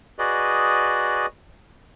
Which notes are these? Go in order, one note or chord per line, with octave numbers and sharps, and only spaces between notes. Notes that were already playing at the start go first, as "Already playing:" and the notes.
F#4 G#4 B4 D5 D#5